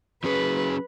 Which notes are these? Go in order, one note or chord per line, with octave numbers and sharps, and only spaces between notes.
F#3 C#4 G#4 B4